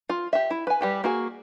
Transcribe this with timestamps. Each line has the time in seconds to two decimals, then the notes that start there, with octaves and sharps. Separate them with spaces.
0.09 F4
0.33 G4 E5
0.50 E4
0.67 B4 G#5
0.81 G3 G4 B4
1.04 A#3 F#4 G#4